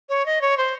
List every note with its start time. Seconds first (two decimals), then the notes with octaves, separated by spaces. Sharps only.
0.09 C#5
0.26 D#5
0.41 C#5
0.57 C5